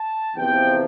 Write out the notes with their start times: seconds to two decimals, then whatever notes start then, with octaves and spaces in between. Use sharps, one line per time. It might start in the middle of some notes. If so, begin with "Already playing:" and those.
Already playing: A5
0.36 E2 C3 F3 G5